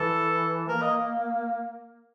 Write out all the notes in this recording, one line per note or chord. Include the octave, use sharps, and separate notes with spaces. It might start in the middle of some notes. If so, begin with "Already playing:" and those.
Already playing: E3 A4
A#3 A#4
D#5